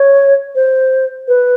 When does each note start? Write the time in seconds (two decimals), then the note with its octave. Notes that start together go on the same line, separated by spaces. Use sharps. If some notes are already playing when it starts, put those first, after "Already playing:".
Already playing: C#5
0.55 C5
1.28 B4